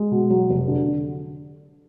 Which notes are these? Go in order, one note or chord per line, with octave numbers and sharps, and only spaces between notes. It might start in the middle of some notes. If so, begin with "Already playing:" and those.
Already playing: G#3
B2
F#3
F1
D3